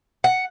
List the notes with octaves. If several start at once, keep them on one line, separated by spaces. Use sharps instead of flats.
F#5